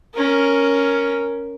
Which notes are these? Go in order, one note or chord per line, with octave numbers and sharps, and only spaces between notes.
C#4 A#4